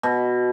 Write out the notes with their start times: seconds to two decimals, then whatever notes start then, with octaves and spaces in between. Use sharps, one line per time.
0.03 B2